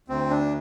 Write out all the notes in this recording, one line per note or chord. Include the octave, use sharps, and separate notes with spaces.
D2 C4
D4